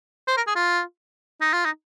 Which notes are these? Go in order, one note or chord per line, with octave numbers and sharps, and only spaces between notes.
C5
A#4
G#4
F4
D#4
F4
D#4